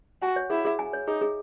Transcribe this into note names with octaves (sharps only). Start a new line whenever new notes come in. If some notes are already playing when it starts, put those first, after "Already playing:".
F#4 G#5
C#5
E4 G#4
G#4
G#5
C#5
D#4 G#4
G#4